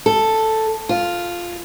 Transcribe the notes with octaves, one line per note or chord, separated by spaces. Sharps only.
A4
F4